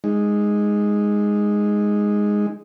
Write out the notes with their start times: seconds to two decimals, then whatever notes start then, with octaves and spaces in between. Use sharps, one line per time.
0.04 G#3 D#4